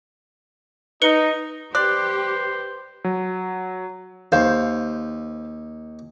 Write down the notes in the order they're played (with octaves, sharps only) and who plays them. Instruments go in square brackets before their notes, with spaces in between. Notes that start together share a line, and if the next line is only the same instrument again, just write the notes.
[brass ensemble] D#4 [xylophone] B4 C#7 G7
[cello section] G4 B4 [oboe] C5 [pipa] D5 [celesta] F#6
[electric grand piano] F#3
[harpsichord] D#2 [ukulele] C5 F5